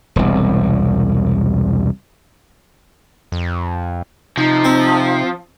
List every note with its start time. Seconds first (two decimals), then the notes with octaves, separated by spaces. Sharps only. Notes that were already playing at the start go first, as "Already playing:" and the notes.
0.16 E1 C2
3.32 F2
4.37 C3 F3 D#4
4.64 C4